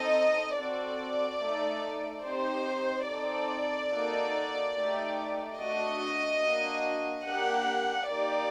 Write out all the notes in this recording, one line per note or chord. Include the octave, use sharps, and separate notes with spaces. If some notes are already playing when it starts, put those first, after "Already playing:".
Already playing: C4 D#4 A4 D#5
C4 F#4 A4 D5
A3 D#4 A4
C4 D#4 G4 C5
C4 D#4 A4 D5
A#3 D#4 F#4 A4
A3 D#4 G4
A3 D4 F#4 D#5
A#3 D4 F#4
A#3 D4 G4 F#5
A#3 D#4 G4 D5